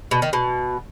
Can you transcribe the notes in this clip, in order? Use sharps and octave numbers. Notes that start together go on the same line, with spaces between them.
B2
D#3
B2